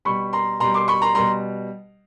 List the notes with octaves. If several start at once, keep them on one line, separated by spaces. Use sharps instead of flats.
B2 G3 B5 C#6
A#5 C6
B2 G3 A#5 C6
C6 D6
B5 C#6
A#5 C6
B2 G3 A#5 C6